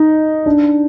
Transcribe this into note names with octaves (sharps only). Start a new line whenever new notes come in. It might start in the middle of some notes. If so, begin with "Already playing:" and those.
Already playing: D#4
D4